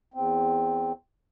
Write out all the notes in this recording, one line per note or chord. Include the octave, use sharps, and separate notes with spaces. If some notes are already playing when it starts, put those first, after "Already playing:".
E2 C4